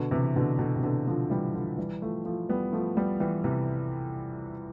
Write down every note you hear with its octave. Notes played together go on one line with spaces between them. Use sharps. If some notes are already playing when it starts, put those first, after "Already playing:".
Already playing: B2 D3
C3 E3
B2 D3
B2 D3
C3
B2 D3
D3 F3
E3 G3
D3 F3
E3 G3
F3 A3
F3 A3
G3 B3
F3 A3
G3 B3
E3 G3
C3 E3